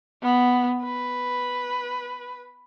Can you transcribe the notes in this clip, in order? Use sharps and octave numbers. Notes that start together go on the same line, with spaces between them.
B3
B4